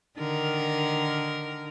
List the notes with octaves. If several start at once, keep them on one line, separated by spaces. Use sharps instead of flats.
D3 D#3 A#4